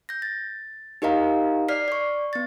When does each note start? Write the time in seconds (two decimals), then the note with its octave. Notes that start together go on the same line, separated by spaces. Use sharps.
0.09 G6 A#6
0.22 A6
1.02 D#4 G4 A#4 D#5 F5 A#5
1.69 D5 F6 B6 C7
1.88 D5 C#6
2.33 B3 A6